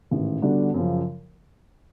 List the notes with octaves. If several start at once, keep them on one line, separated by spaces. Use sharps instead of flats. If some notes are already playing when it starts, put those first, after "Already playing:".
A1 G#2 D#3
D3 G3 B3 D4 F#4
F#2 C#3 F3